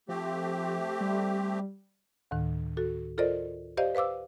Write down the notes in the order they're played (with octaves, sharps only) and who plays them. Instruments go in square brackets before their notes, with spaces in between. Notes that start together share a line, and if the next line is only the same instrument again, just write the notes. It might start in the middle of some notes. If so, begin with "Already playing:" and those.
[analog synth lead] F3 [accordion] A3 C4 G4
[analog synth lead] G3
[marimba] D2 A2 D#3
F#4 A4
F4 A4 A#4 C5 D5 D#5
G4 C5 D5 D#5 F5
B4 C5 F5 D6 E6